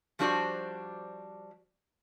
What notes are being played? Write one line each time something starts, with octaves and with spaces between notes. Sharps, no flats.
F3 G3 D4 F#4 C5 D5